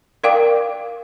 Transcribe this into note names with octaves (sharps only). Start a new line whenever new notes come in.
A#4 D5 F5 G5 D6